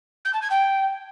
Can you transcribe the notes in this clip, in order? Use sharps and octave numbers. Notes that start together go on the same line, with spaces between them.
G6
A5
G#6
G5